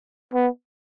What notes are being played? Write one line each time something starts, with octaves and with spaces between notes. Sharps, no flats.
B3